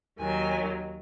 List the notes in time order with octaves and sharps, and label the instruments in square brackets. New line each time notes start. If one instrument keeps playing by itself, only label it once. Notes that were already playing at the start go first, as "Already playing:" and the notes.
[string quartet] D#2 D#3 F#3 G#5